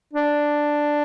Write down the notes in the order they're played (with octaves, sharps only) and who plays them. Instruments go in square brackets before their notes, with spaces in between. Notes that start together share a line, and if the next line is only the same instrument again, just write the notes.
[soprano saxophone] D4